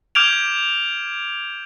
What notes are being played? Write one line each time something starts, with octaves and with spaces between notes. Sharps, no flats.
D6 F6 G6 G#6 D7 F7